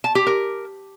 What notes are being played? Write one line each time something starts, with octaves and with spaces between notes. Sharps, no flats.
A5
G4
A#4